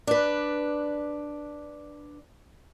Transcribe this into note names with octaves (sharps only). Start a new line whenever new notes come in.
D4 B4